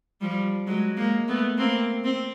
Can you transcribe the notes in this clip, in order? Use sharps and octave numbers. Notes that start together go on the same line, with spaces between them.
F3 G3
F#3 G#3
G#3 A#3
A3 B3
A#3 C4
C4